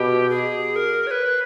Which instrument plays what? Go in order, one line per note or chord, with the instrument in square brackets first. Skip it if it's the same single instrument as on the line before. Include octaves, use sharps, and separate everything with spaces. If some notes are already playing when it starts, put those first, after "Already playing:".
Already playing: [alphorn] B2 [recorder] G4
[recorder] G#4
A#4
C#5
B4